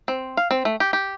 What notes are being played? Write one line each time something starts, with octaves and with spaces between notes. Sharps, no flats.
C4
F5
C4
A3
G4
G4